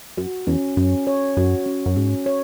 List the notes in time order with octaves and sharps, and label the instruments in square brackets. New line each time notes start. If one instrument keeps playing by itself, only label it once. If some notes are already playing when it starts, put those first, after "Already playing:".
[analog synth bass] F#2 [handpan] F#4
[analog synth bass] E2 [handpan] C#4
[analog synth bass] F#2 [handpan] C#4
[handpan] C#5
[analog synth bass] F#2 [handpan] F#4
[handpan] C#4
[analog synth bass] F#2
[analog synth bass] G#2 [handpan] C#4
[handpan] C#5